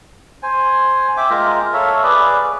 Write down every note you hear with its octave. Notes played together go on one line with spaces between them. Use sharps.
C5 G#5
E5 G5 D6
G#3 F4 A#4 A#5
A4 C#5 E5 F5
G#4 B4 D5